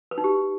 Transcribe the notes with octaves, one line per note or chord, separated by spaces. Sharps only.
B4
D#4
G4